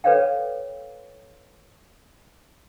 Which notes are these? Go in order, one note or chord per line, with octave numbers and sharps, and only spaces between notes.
A4 B4 C#5 D5 F5 G5